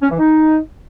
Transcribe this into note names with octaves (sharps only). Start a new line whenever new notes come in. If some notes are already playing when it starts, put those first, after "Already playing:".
C#4
E3
D#4